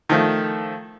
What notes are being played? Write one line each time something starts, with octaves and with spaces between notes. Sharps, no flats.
D#3 F3 A3